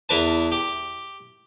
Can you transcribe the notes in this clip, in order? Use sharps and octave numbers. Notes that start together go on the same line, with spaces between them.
E2 A#4 B4 A5
G4